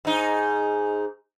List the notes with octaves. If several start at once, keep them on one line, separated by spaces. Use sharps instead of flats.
G#2 D#4